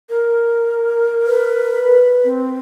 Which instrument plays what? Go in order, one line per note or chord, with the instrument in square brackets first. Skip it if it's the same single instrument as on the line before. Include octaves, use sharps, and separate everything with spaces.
[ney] A#4
[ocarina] B4
[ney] C4